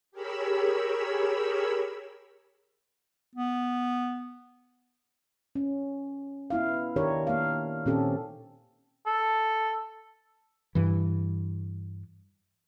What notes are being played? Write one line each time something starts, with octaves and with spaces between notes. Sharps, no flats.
G4 G#4 A#4 C#5 B5 E6
B3
C#4
B3 E4 F5
D#3 D4 G4 A#4 C#5
A#3 F5
A#2 D#3 C4 C#4 G4 A4
A4
G2 E3